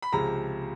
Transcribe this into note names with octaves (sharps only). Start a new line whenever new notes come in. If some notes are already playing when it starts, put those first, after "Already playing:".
B5
C#2 C3 F3 G#3 A#5